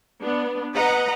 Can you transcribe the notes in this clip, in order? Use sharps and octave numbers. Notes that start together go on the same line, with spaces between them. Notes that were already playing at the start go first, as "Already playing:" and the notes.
B3 D4
B4 D#5 F#5 A#5